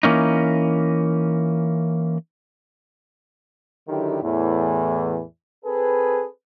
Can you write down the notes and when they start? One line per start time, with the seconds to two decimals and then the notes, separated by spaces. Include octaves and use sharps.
0.03 E3 A#3 C#4 D#4
3.88 D3 D#3 F#3 E4 G4
4.23 E2 A2 E3
5.64 C4 G#4 A4 B4